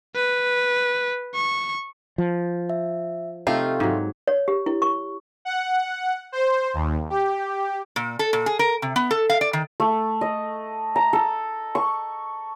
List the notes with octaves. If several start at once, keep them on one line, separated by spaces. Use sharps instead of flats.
B4
C#6
F3
E5
C3 A3 D#4 F4 A4 F5 G5
G#2 F#3
C#5
G4
E4
C#6
F#5
C5
D#2
G4
A#2
A4
A#2
G#4
A#4
C3
B3
A4
F5
D5
D#3
A3
D#5
A#5
A4
C#6